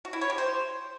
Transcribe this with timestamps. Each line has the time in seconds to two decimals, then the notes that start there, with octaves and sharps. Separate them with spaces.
0.05 F#4
0.13 E4
0.21 C#5
0.30 G4
0.38 C5